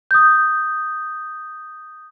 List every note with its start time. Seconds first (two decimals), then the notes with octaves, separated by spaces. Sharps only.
0.11 D#6 G6